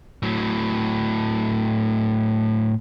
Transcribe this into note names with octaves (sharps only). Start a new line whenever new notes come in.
A2 F#3